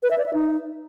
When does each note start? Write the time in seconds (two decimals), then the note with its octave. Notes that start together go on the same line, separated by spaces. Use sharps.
0.03 B4
0.10 E5
0.18 D5
0.26 E5
0.33 D#4